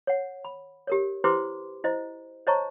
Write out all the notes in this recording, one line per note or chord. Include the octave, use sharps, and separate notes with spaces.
C#5 F#5
B5
G4 A#4 C#5
E4 G4 B4 C5 C6 D6
E4 C5 D#5
C5 C#5 D#5 A5 A#5 C#6